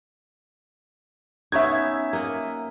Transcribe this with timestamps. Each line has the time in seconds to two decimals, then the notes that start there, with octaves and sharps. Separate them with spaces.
1.52 B3 C#4 D#4 E5 G#6
2.13 A#3 D#5 F#5